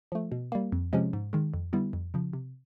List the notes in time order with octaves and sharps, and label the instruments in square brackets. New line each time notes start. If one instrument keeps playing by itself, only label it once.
[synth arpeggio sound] F3 A3
B2
G3 A#3
F2
C3 F3 G#3 C#4
G#2
D#3 G#3
F2
D3 G3 B3 E4
F2
C#3 F3
C3